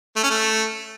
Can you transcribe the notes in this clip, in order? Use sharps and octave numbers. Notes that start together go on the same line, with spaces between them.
A3
C#4
A3